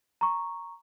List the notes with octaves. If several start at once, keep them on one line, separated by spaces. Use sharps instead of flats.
A#5 C#6